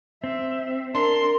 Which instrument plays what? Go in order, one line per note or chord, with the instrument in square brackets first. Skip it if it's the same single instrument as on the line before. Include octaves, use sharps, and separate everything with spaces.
[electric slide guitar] C4 [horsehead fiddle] E5
[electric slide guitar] D4 [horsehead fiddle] A#4 [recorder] C6